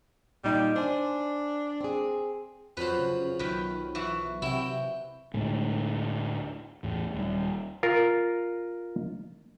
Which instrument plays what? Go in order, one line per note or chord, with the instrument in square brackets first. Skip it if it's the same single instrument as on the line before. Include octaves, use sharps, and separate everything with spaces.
[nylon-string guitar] A#2 D#4 [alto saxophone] G3
[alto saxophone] D4 [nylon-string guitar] C5 G#5
[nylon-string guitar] C4 G#4
[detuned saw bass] F2 [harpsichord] F3 F#3 [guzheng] B4 C5
[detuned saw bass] C#3
[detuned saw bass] B1 [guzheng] D#3 B4
[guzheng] E3 F#4
[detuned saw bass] C3 [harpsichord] F#3 G5 [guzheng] E4
[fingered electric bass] D2 A2 G#3
E2 A2
D#1 G3
[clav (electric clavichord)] F4 A#4